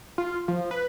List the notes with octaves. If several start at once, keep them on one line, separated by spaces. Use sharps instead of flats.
F4
F3
B4